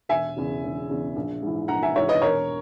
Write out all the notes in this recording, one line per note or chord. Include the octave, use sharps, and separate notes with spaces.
E1 E5 G#5
E2 C#3
E1
E2 C#3
A#1
G#2 E3
A#1 F#5 A#5
E5 G#5
G#2 E3 C#5 E5
B4 D#5
E1 A#4 C#5